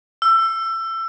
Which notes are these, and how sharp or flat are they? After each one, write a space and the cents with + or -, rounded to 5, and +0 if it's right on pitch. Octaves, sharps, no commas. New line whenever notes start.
E6 +20